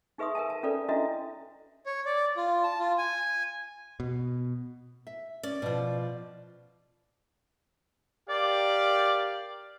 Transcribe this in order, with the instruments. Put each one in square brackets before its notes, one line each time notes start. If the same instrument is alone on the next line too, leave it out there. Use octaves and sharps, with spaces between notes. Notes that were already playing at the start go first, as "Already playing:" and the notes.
[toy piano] D#4 G#4 B4 E5 C6 D#6
A#4 E5 G#5 A5
A5
C#4 F4 A4 B4 D5
C#4 D4 E4 F#4 D#5 E5
[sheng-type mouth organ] C#5
D5
F4
A5
F4
G#5
[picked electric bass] B2
[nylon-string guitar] E5
[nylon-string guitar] C#4 [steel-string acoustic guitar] D5
[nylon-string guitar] B2 F3
[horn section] G4 A#4 F5 [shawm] D5